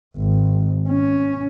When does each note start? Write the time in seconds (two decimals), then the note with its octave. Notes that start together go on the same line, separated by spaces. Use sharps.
0.17 G#1
0.89 C#4